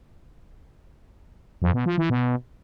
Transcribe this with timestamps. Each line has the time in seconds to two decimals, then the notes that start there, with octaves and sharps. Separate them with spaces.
1.62 F2
1.74 B2
1.86 F3
1.98 E3
2.10 B2